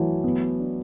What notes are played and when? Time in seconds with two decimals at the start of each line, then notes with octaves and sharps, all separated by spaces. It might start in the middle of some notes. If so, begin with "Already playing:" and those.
Already playing: E3 F#3 A3
0.24 B3
0.59 D4